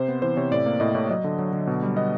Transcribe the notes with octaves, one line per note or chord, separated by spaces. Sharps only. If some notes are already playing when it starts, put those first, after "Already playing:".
Already playing: C3 C5
B3
E3 C5
C3 C#5
A2 D5
A#3
A2 D#5
A2 C#5
F#3 D#5
D3
F#3
D3
B2
G3
B3 D#5